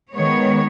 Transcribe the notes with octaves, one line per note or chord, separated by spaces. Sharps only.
D#3 G#3 B3 C#5